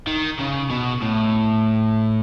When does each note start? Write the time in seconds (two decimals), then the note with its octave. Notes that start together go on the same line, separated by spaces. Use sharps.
0.07 D#3
0.39 C#3
0.70 B2
1.02 A2